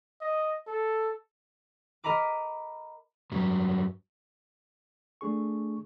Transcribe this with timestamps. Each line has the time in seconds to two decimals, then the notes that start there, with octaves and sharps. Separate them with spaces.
0.21 D#5
0.67 A4
2.04 A#4 D#5 A#5 B5 D6
3.32 G2 F#3
5.21 A3 D4 G#4 C#6